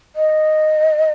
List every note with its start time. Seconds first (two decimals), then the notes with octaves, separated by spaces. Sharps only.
0.16 D#5